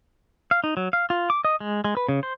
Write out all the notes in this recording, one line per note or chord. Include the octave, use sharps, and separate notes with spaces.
F5
D#4
F#3
F5
F4
D6
D#5
G#3
G#3
B4
C#3
C5